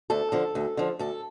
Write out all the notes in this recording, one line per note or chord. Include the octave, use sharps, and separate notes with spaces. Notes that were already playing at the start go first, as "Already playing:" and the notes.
D2 A4
D3 F3
D2
D3 F3
D2 A4